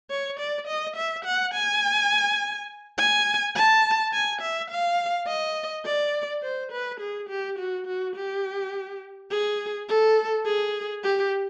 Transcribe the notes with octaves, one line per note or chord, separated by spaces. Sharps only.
C#5
D5
D#5
E5
F#5
G#5
G#5
A5
G#5
E5
F5
D#5
D5
C5
B4
G#4
G4
F#4
F#4
G4
G#4
A4
G#4
G4